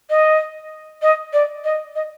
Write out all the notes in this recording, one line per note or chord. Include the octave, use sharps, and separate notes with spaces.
D#5
D#5
D5
D#5
D#5